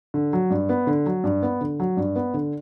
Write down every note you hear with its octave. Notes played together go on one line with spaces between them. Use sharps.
D3
F#3
G2
B3
D3
F#3
G2
B3
D3
F#3
G2
B3
D3